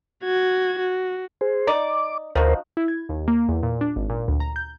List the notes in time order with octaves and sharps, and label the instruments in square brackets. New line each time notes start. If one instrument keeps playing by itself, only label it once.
[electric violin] F#4 G#6
F#4
[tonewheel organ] G#4 C5
[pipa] D#4 D5 [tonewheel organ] D6
[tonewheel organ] D2 A#4 C5 [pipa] F3 D#4 F#4
[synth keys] E4
G#6
D#2
A#3
E2
A#2
D4
G#1
A#2
D2
A#5
G6